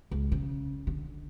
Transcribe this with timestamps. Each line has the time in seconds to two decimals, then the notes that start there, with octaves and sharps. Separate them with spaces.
0.11 C#2
0.32 C#3
0.87 D3